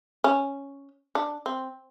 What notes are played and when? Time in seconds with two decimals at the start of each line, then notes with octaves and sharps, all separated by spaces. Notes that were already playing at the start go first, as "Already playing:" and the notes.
0.24 C#4
1.15 D4
1.46 C4